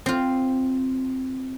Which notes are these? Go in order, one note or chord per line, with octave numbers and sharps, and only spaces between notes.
C4 F4